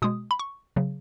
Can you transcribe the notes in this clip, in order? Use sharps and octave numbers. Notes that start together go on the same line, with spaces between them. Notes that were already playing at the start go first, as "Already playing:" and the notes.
B2 G#3 D#6
B5
C#6
C#3 F#3